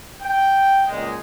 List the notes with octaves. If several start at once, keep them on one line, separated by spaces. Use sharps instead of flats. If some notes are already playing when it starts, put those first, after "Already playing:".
G5
C#2 A#2 G#3